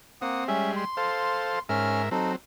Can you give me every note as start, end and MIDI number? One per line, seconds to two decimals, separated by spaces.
0.22 0.44 58
0.22 0.48 60
0.22 0.44 78
0.22 0.44 87
0.48 0.85 55
0.48 0.85 56
0.48 0.72 61
0.48 0.72 76
0.76 1.60 84
0.97 1.59 69
0.97 1.59 72
0.97 1.59 77
1.69 2.09 44
1.69 2.02 61
1.69 2.09 70
1.69 2.09 76
1.69 2.02 89
2.11 2.36 54
2.11 2.36 60
2.11 2.32 63
2.11 2.32 69